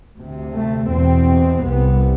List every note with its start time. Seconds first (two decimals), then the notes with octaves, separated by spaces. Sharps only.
0.18 D2 C3
0.55 A3
0.91 E2 B2 C4
1.65 C2 C3 B3